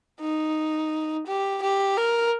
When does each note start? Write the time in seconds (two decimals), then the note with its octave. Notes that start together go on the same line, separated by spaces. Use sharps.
0.21 D#4
1.27 G4
1.62 G4
1.97 A#4